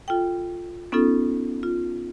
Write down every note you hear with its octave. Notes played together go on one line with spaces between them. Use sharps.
F4 A4 G5
B3 C#4 D#4 F4 A4
F4